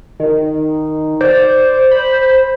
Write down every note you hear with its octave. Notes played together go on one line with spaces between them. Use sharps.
D#3
C5 D5
B5